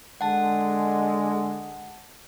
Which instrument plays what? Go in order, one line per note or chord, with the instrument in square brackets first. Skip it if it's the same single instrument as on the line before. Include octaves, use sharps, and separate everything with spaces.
[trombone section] D3 G#3 [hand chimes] F#5 A5